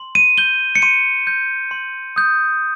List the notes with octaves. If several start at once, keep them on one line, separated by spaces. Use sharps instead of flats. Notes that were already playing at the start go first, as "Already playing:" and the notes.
Already playing: C6
D#7
G6 G7
C#7
C6 D#7
G6
C6
D#6 G6